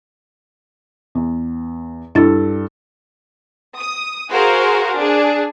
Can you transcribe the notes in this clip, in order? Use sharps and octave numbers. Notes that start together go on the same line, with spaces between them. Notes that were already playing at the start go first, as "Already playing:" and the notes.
E2
G2 D4 E4 A4 A6
D#6
F#4 G#4 A#4 C5 F5
D4 G#4